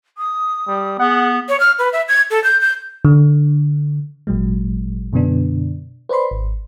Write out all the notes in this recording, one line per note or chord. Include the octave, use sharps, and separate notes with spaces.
D#6
G3
B3 G#4 F#5
C#5
F6
B4
E5
G#6
A4
G6
G6
D3
G#1 A#2 F#3 G#3
F#2 B2 D3 B3 D4
B4 C5 D5 B5 C6
G#1